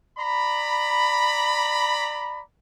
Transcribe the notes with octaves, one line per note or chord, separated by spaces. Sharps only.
D5 A#5 B5